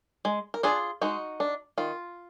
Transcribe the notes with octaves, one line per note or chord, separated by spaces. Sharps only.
G#3
A#4
D4 F4 G#4
G#3 D#4 F#4
D4
D#3 F4